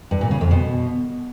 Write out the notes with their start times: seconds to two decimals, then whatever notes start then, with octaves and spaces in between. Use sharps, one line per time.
0.11 G2
0.21 A#2
0.31 C#3
0.41 F2
0.51 B2